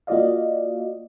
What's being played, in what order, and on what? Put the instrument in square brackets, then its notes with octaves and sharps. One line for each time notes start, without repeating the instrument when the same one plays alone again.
[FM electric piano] A#3 F4 F#4 D5 D#5 F5